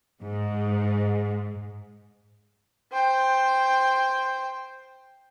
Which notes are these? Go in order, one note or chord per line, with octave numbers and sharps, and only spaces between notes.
G#2
C5 G5